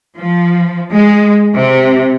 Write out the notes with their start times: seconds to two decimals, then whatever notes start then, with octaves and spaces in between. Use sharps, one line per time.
0.17 F3
0.92 G#3
1.53 C3